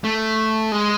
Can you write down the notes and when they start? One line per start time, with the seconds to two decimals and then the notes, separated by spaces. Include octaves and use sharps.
0.04 A3
0.72 G#3